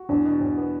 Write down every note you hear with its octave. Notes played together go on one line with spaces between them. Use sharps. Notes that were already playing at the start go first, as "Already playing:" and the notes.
Already playing: F#4
E2 D4
B2
E2
B3